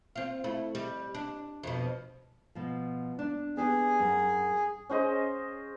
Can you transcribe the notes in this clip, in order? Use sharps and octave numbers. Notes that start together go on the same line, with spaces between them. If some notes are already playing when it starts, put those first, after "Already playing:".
C4 F4
A3 E4
G3
D4
F2 B2
B2 F3
D4
B3 D4 G4 G#4
F#2
C#4 G#4 C5 D#5